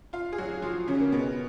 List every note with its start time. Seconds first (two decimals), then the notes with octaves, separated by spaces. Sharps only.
0.13 F4 F5
0.33 G#4
0.38 F#3 F#4
0.62 F3 F4
0.88 C#3 C#4
1.00 A#3
1.12 B2 B3